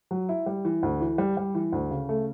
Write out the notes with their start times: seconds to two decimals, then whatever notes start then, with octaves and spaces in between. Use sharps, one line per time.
0.11 F#3
0.29 E4
0.46 G3
0.65 E3
0.83 D2
1.01 E3
1.18 G3
1.37 G3
1.55 E3
1.72 D2
1.91 C#3
2.09 A3